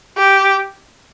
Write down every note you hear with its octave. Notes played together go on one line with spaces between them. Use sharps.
G4